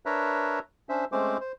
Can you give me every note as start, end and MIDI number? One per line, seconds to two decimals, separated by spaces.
0.06 0.59 62
0.06 0.59 70
0.06 0.59 71
0.06 0.59 73
0.06 0.59 76
0.06 0.59 82
0.89 1.05 61
0.89 1.05 62
0.89 1.05 72
0.89 1.05 76
1.12 1.37 56
1.12 1.37 57
1.12 1.37 60
1.12 1.37 61
1.12 1.37 72
1.12 1.37 86
1.40 1.52 72